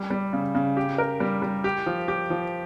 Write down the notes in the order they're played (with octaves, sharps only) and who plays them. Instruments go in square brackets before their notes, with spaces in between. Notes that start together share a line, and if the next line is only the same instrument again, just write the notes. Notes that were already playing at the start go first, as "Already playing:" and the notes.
Already playing: [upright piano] G3
G3
C#3
C#3
G4
A#4
G3
G3
G4
F3
G4
F3